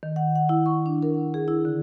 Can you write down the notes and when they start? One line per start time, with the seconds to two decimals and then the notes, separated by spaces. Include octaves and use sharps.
0.03 D#3
0.16 F#5
0.36 F#5
0.49 E4
0.66 C#6
0.86 D4
1.03 A#4
1.14 F#5
1.34 G#4
1.48 E4
1.65 D3